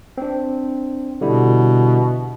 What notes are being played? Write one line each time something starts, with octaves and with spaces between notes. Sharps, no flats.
C4 D4
B2 D3 G3 E4